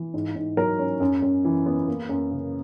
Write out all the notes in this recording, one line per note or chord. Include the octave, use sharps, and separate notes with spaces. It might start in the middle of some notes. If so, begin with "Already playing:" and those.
Already playing: E3
G#2
G#2
F#3 A#4
C#4
F#2
F#2
E3
B3
A#3
F#2
C#3